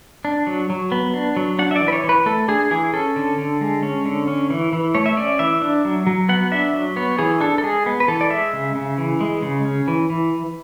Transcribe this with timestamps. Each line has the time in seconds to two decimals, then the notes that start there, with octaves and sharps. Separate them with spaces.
0.25 D4
0.47 F#3
0.70 F#3
0.92 B3
1.14 D4
1.37 F#3
1.59 D4 F#5
1.71 E5
1.76 E3 D5
1.88 B4
1.92 C#5
2.04 E3
2.09 B4
2.26 A3 A4
2.48 D4 G#4
2.71 E3 G#4
2.93 C#4 A4
3.16 D3
3.38 D3
3.61 G#3
3.83 C#4
4.05 D3
4.27 C#4
4.50 E3
4.73 E3
4.95 A3 C#5
5.06 E5
5.17 C#4 D5
5.39 E3 E5
5.62 D4
5.85 F#3
6.07 F#3
6.29 B3 F#5
6.51 D4 E5
6.73 F#3
6.96 B3 C#5
7.18 E3 G#4
7.41 D4 A4
7.58 A4
7.63 G#3 G#4
7.86 B3
8.00 B4
8.08 E3 A4
8.21 D5
8.30 G#3 E5
8.53 C#3
8.75 C#3
8.98 E3
9.21 G#3
9.42 C#3
9.65 C#4
9.88 E3
10.10 E3